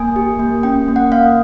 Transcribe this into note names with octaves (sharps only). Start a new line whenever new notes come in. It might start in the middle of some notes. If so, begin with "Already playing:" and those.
Already playing: A#3 G#5
G4
A#3
C#4 G5
A#3
F#5
A#3 F5